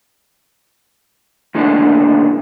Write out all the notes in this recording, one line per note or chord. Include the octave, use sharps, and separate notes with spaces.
D#2 A2 D3 D#3 G#3 D4